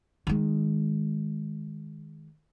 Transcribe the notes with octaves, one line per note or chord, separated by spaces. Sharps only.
D#3 G#3